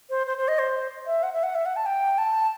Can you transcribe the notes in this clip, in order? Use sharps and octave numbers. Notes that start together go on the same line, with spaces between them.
C5
C5
C5
D#5
C5
E5
F#5
E5
F#5
E5
F#5
A5
G5
A5